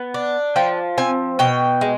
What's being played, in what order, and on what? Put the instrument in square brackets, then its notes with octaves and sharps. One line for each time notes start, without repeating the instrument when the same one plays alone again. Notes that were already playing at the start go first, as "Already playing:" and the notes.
Already playing: [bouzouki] B3
D4
F3 G5
C4 G#5
B2 G5
G#3